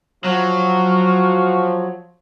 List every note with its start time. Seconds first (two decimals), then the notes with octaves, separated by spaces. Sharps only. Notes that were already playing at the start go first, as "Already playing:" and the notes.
0.24 F3 F#3 F#4 F5